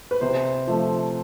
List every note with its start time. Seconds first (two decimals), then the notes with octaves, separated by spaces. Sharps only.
0.11 B4
0.21 C3 C5
0.67 F3 A3